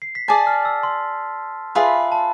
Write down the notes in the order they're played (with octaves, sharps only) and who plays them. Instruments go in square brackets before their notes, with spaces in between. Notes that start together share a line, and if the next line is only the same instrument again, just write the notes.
[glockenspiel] C7
B6
[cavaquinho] G#4 D5 G#5 [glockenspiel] A5 A6
[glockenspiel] F6
E6
C6
[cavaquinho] F4 G#4 B4 E5 [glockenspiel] B5
[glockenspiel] A5